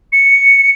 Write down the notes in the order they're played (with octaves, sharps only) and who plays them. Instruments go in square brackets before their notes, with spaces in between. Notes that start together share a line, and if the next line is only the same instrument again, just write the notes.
[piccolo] C#7